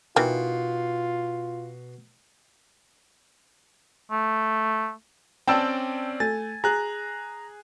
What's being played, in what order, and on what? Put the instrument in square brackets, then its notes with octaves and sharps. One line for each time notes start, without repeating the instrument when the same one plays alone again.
[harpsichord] B2 [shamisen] D#3 E3 [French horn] F4
[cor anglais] A3
[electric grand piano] C4 C#4 D5 [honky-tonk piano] G5 A5 E6
[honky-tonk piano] A3 [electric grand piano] G#5 A6
[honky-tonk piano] G#4 [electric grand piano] A#5 F#6